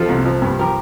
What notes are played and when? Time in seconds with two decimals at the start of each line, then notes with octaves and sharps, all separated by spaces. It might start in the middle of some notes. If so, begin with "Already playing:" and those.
Already playing: F2 F3 F4 A4
0.09 C2
0.26 F3
0.42 G2
0.59 F3 G4 A#4